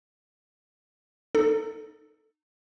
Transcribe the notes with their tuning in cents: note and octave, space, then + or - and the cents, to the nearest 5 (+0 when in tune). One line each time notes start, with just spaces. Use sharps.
D#4 -25 A4 +0